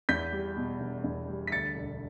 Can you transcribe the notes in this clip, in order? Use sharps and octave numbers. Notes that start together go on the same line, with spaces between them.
E2 G6 B6
G3
B2
E1
E2
G3
B6
D2 A6 C#7
E1